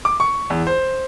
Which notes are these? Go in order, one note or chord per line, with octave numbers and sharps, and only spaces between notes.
D6
C#6
E2
C5